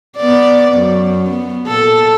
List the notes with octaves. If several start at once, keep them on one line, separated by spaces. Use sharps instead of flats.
B3 D5
F#2
B3
A#2 A4